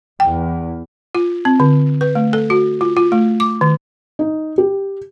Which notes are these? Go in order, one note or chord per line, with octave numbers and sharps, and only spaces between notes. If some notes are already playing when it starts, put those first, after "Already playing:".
E2 G5
F4
C4
D3
B4
A3
A4
F#4
F4
F4
A3
D6
D#3
D#4
G4